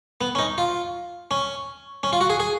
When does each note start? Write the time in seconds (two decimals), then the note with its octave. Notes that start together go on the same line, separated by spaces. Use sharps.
0.21 B3
0.35 C#4
0.39 D#4
0.58 F4
1.31 C#4
2.03 C#4
2.13 F4
2.21 F#4
2.30 G#4
2.40 G#4